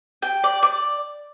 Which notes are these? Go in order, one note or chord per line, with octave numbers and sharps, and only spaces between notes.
G5
D5
D5